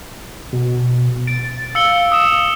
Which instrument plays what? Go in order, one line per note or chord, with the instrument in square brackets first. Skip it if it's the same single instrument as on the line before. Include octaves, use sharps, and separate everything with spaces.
[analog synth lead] B2
[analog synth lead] A6 [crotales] D7
[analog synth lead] F5 [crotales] E6 C#7 G7
[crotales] D#6 E7